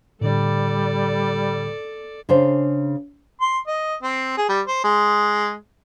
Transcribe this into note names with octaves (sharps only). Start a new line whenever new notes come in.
A2 D3 G3 A4 D5
C#3 D4 C5
C6
D#5
C4
G#4
G3
C5
G#3